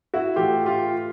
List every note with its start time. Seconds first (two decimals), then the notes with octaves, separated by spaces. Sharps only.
0.14 E4 F#4
0.36 A2 E3 A3 F4 G4
0.66 F4 G4